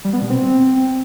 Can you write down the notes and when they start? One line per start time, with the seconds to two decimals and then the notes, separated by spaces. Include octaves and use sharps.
0.05 G3
0.13 B3
0.22 B2
0.30 C4